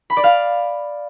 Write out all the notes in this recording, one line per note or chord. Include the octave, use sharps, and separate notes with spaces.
B5
D5
F5